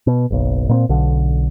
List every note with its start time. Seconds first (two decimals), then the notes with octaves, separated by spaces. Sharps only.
0.07 B2
0.31 F#1 B1
0.69 A#2 B3 C4
0.89 B1 D3